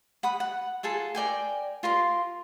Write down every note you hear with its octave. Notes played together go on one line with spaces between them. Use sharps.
F#5 B5 D#6
F#5
F4 G#4 A4 A5
A#4 D5 G5 G#5
F4 A#4 C6